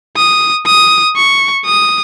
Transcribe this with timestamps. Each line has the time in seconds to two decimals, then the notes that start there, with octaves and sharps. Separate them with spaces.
0.17 D#6
0.66 D#6
1.17 C#6
1.66 D#6